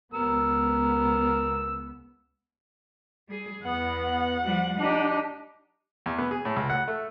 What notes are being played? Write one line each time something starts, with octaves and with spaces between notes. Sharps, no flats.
C#2 B3 A#4 E6
G3 G#4
E2 B3 F#5
F3 G3
D4 D#4 G4
E2
B3
G#4
A2
C#2
F#5
A3